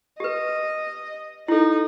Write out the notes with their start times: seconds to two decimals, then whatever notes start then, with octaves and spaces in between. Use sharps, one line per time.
0.20 G4 B4 D#5
1.48 D#4 E4 A4